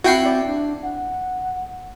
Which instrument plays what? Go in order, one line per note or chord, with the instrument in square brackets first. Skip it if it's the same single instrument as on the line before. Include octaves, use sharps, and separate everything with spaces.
[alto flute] C4 [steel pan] E4 F#5 [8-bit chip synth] F#4 G5 C7
[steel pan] D5
[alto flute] D4
F#5